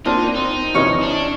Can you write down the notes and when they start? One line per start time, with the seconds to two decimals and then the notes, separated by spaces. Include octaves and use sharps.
0.05 A#3 C4 D4 D#4 F4
0.35 C4 D#4
0.74 F2 C3 E3 C#4 C#5 D#5
1.02 D4